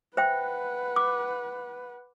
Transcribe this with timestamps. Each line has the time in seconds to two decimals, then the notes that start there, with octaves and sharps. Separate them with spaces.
0.17 B4 C5 E5 F#5 G5
0.96 D6